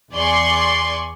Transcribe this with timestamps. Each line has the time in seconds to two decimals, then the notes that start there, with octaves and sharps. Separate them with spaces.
0.12 E2 D5 G#5 C6 C#6